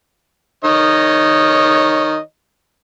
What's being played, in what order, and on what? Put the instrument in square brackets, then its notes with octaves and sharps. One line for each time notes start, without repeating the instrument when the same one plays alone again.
[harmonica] D#3 C#5 D#5